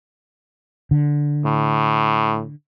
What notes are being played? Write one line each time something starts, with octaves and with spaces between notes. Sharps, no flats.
D3
A2